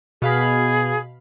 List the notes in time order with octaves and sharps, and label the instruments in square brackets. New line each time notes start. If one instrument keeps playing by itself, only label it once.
[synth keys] B2 F5 B5 [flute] G#4